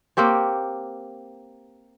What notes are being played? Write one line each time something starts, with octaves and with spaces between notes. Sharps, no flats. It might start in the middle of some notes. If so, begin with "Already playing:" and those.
A#3 C4 G4 C#5